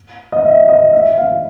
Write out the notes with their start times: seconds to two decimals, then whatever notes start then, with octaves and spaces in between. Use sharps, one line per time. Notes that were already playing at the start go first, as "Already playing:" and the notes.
0.32 D#5
0.45 E5
0.69 D#5
0.93 E5
1.18 F5